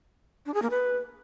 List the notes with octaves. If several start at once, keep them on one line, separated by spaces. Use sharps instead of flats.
D4
G#4
A#3
B4